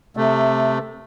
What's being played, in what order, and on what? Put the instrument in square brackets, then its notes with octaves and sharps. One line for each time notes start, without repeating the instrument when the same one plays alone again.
[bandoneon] C3 A3